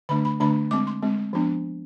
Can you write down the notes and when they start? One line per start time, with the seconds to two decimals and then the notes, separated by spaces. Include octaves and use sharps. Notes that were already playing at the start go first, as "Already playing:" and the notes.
0.09 D3 A3 D4 B5
0.25 B5
0.40 D3 A3 D4 B5
0.71 G#3 C4 D6
0.87 C6
1.02 G#3 C4
1.33 F3 B3 D4